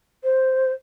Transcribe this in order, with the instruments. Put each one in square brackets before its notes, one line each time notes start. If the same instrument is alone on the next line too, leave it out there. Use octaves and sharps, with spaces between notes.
[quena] C5